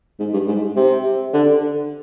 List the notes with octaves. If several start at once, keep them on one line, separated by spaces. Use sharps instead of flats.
G#2
G2
G#2
C3
D3